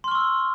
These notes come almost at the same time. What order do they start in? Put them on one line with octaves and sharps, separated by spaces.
C6 F6 C#6 E6